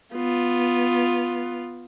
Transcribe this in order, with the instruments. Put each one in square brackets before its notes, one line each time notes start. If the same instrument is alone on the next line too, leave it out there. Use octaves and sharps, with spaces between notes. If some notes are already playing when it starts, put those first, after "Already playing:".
[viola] B3 F4